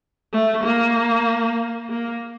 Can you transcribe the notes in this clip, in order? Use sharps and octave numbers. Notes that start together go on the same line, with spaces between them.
A3
A#3
A#3